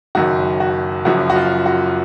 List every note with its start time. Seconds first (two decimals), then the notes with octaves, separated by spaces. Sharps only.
0.15 F#1 F#2 D#3 F#4
0.60 F#4
1.05 F#1 F#2 F3 F#4
1.30 F#4
1.36 F4
1.66 F#4